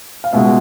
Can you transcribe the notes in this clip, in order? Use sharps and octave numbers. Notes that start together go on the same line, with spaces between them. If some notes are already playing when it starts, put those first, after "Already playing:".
F5
C#2 B2 G#3 E5